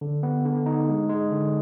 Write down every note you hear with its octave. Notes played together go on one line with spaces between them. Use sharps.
D3
B3
D3
D#4
G#3
G#3
D3